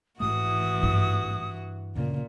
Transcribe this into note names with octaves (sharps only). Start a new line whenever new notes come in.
A1 G#2 E3 A3 F#4 D#6
G2 E4
D2 A#2 C#3